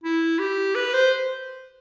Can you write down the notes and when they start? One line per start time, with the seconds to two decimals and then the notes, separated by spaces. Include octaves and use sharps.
0.04 E4
0.39 G4
0.75 B4
0.94 C5